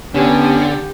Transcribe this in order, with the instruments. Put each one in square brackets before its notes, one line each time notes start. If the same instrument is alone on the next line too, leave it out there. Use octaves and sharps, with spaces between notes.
[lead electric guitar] D3 [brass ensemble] B3 C#4 [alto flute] G4